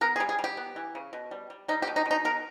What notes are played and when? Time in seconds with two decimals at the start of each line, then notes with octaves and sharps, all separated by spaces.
0.01 B3 A#4
0.16 G#4
0.20 G3
0.29 G#4
0.39 G3
0.44 G4
0.57 B3
0.76 E3
0.95 C#3
1.13 B2
1.31 G3
1.50 G3
1.68 G3 D#4
1.82 G4
1.87 B2
1.96 D#4
2.06 B2
2.11 D#4
2.25 B3 A#4